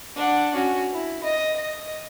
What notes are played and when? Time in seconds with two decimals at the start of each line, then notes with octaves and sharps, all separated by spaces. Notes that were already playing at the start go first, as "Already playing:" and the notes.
0.16 D4 F#5
0.54 C#4 F#4
0.92 E4
1.23 D#5
1.56 D#5